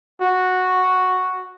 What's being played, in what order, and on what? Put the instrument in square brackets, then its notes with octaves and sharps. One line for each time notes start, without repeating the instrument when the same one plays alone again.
[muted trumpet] F#4